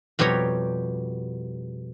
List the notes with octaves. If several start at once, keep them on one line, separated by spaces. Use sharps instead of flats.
F2 B2 G3 G4 C#5 A#5